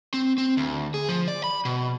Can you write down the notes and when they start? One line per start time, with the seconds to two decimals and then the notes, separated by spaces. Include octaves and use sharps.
0.14 C4
0.38 C4
0.57 D2
0.94 G#4
1.09 F3
1.28 D5
1.44 B5
1.65 B2